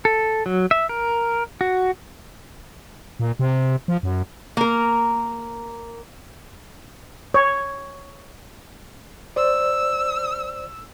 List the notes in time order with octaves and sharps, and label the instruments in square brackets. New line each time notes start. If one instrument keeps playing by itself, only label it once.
[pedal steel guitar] A4
F#3
E5
A#4
F#4
[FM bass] A#2
C3
F3
F#2
[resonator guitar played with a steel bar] A#3 A#4
[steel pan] C#5
[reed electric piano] C5 D5 [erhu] E6